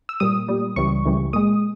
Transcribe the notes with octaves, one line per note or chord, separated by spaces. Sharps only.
E6
A#2 G3 D#6
A#2 G3
C#2 C#3 E3 G3 C#6
C#2 C#3 E3 G3
A#2 G#3 D#6